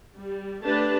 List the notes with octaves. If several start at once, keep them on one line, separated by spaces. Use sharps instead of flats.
G3
A3 D4 G4 B4 A5